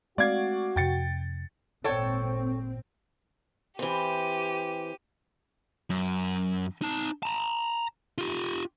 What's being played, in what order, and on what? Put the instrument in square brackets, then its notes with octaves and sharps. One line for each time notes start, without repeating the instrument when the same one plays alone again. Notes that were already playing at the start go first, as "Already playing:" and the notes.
[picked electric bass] G#3 A3 C4 [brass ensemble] F#4 [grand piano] D5 F5 G#6
[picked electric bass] F2 C3 [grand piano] G5 A6 C#7
[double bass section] G#1 A#2 C4 [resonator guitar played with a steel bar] A4 C#5 G5
[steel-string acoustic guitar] E3 C4 [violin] G4 D#7
[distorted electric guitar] F#2
D#4 A5
A5 A#5
F4 G4